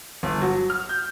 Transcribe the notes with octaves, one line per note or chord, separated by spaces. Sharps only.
G1
F#3
F6
G6